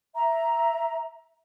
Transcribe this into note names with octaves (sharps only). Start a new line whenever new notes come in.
E5 A#5